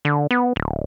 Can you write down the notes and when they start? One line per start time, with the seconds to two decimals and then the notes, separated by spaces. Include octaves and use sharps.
0.05 D3
0.31 B3
0.56 D1